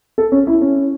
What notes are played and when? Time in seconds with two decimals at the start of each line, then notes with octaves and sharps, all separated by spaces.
0.18 A4
0.32 C#4
0.47 E4
0.61 C#4